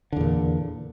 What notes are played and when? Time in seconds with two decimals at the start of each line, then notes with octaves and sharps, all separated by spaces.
0.12 D3
0.17 E2
0.21 A#2